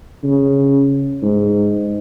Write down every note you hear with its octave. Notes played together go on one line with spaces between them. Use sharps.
C#3
G#2